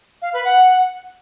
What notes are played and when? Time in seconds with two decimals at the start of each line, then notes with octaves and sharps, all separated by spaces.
0.22 F5
0.33 B4
0.44 F#5